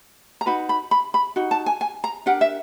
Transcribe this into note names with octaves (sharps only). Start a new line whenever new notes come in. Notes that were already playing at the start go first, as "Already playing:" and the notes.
A#5
D#4 F#4 B4 B5
B5
B5
B5
D#4 F#4
A5
G#5
G#5
A#5
D4 G4 A#4 F#5
E5